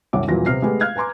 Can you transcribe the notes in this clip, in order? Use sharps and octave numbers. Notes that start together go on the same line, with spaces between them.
C2 F#2 C#5 F#5 D6
D#1 A#2 E3 F#3 A#6
C3 B3 F6 C7
G#3 A3 B3 G4 G#4
F5 F6 F#6 G#6
B4 G#5 A#5 C6 D6